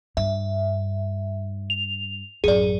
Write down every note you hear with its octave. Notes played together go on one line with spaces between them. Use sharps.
G2 E5
F7
A1 F#2 G#4 D5